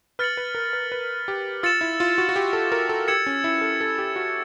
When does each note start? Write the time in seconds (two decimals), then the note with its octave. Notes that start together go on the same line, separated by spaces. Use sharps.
0.19 B4 F6 A6 C#7 F#7
0.37 B4
0.55 A#4
0.73 B4
0.92 B4
1.28 G4
1.63 F4 E6 A6 C#7 E7
1.81 E4
2.00 F4
2.18 F#4
2.29 F#4
2.36 G4
2.53 A4
2.72 A#4
2.89 A4
3.08 G4 E6 G#6 C#7 E7
3.27 C#4
3.44 E4
3.61 A4
3.81 A4
3.98 G4
4.16 F#4